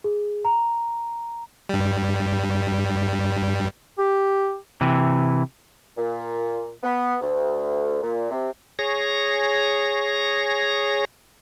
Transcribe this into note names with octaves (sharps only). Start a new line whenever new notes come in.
G#4
A#5
G2 G3
G4
C3 E3
A#2
B3
D2
A#2
C3
G#4 C#5 A#6